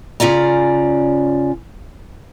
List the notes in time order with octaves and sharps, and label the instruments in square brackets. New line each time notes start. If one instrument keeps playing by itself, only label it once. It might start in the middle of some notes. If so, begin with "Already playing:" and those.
[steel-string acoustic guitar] C#3 C#4 F4 D5 A#5